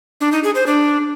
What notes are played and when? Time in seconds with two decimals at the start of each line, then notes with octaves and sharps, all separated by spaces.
0.21 D4
0.32 D#4
0.44 G#4
0.55 C5
0.67 D4